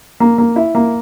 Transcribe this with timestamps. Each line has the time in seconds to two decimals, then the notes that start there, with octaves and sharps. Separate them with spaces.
0.20 A#3
0.38 A#3
0.56 E4
0.75 A#3